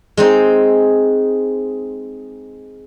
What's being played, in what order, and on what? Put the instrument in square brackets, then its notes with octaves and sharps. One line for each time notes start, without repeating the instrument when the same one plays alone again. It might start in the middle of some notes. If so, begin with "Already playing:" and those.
[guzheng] G#3 C4 D#4